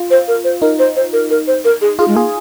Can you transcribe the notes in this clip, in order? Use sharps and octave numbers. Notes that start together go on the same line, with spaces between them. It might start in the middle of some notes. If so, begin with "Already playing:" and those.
Already playing: F4
C5
A#4
C5
D#4 A#4
C5
C5
A#4
A#4
C5
A#4
G#4
F4 G#4
G#3
A#3 G#4